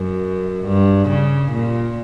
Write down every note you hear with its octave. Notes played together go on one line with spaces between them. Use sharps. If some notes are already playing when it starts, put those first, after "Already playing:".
Already playing: F#2
G2
C#3
A#2